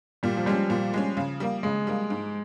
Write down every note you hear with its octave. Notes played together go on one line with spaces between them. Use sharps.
A#2 G3
F3
G3 G#3 C#4
A#2 F3
G#3 C#4
C#3
G3 A#3
C#3 G#3
G3 A#3
G#2